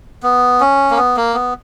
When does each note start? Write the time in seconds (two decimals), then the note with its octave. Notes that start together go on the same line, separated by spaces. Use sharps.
0.23 B3
0.61 C#4
0.91 A#3
0.97 B3
1.17 A#3
1.34 B3